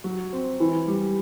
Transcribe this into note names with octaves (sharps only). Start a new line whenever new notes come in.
F#3
C4
E3
G3